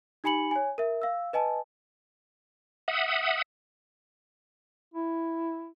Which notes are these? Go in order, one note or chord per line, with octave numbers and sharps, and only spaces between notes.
D#4 G4 G#5 B5 C#7 F#7
C#5 G#5
A#4 E5
F5 E6
B4 D#5 G#5 A5
E5 F#5 D#6
E4